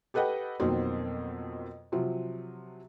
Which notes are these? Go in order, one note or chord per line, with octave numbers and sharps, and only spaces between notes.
G4 A4 B4 D#5 F#5 G5
F2 B2 D#3 F#3 A#3 C4
C3 F3 F#3